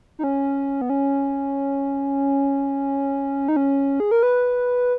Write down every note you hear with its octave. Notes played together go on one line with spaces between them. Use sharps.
D#4
C#4
B3
C#4
D#4
C#4
G#4
A#4
B4